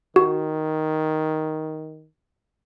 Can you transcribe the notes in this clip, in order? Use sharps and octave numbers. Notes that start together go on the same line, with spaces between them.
D#3 F#4